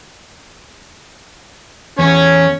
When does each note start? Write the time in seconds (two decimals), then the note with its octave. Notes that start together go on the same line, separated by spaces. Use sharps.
1.99 E2 C#4 C#5